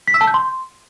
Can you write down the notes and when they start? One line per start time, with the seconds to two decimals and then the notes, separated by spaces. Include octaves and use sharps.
0.08 B6
0.14 E6
0.21 A5
0.27 G6
0.34 C6